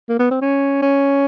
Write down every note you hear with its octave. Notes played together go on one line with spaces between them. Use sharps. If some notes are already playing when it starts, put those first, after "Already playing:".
A#3
B3
C4
C#4
C#4